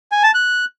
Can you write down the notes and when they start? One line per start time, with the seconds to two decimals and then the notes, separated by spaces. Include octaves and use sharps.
0.12 G#5
0.23 A5
0.34 F#6